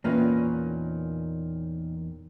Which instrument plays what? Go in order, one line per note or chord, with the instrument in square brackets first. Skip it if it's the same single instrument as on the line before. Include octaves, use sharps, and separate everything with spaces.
[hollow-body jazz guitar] E2 A#3 C#4 [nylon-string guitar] A#2 D#3 B4